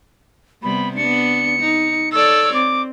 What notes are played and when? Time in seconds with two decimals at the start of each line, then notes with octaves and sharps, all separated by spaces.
0.63 C3 G3 B3 B5
0.97 B3 D4 C#7
1.60 D#4
2.12 A4 C#5 D5 E6
2.54 C4 D6